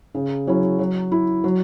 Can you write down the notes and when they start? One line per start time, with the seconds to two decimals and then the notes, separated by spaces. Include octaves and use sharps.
0.15 C#3
0.47 F#3 C#4 E4
0.79 F#3
1.12 E4
1.44 F#3